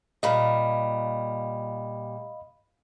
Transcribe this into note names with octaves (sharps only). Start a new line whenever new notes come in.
A#2 G3 D#5 F5 B5